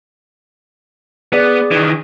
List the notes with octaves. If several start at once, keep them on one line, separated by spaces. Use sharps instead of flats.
B3 G#4 D5
D#3 E3